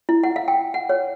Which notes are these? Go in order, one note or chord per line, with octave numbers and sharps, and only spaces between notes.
E4
F#5
F5
G5
F#5
C#5